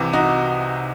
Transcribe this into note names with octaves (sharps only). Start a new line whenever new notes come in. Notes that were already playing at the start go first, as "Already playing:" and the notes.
Already playing: C2 C3 E3
D#4 F#4